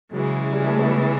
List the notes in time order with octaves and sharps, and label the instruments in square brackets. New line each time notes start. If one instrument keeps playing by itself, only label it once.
[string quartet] C#3 E3 G#3 [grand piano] F#3
[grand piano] G3
A3
B3